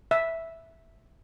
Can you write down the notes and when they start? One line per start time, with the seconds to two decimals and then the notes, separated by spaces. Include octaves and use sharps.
0.11 E5